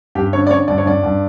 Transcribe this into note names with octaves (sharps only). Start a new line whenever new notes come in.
G2 G4
D3 C#5
D5
D3 C#5
G2 D5
C#5
G2 D5
G2